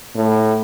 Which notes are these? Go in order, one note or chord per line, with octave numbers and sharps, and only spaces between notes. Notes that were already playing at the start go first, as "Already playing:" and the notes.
A2